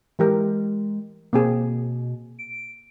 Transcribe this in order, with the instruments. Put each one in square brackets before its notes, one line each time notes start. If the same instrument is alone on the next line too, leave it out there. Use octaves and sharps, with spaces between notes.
[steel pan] E3 G4 A#4 [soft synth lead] G#3
[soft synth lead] B2 [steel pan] A#3 C4 G#4
[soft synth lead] D7